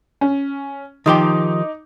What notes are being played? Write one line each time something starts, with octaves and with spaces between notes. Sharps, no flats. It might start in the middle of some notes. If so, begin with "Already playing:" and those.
C#4
D#3 F3 D#4 G4 D6